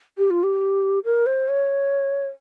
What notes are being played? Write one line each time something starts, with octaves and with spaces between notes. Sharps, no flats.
G4
F4
G4
A#4
C5
C#5